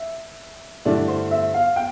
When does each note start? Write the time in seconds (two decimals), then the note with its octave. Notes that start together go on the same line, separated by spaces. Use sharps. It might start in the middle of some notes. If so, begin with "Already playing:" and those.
Already playing: E5
0.85 G2 D3 A3 E4 D5
1.08 C5
1.31 E5
1.54 F5
1.76 G5